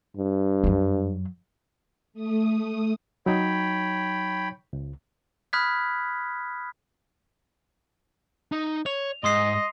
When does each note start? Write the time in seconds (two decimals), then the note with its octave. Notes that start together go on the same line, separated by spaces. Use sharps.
0.17 G2
0.63 F#2 F#3
2.13 A3 D#6
3.26 F#3 D#4 C#5 G5 B5
4.73 C#2
5.53 B5 D#6 F6 F#6 G#6 B6
8.52 D#4
8.86 C#5 F7
9.24 G#2 D#5 C6 D#6 C7